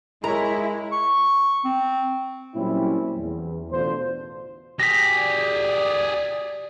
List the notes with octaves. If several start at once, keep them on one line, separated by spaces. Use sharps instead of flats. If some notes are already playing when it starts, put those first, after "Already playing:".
G#3 E4 A#4 C#5 A#5
C#6
C4
A#2 F#3 G3 C4 C#4 E4
E2
A1 B2 D3 D4 F4 C5
G4 G#4 A#6 B6
D5